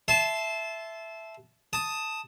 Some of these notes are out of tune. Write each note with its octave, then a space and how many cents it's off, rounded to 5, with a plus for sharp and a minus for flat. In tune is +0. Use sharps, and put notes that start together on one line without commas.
E5 +5 A5 -20 C6 +0
A5 +0 D#6 +0